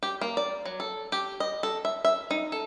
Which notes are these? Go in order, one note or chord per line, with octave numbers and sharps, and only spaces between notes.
G4
A#3
D5
F#3
A4
G4
D#5
A4
E5
E5
D#4
A4